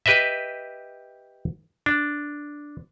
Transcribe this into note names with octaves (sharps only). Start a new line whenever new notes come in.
G4 B4 D#5 E5
D4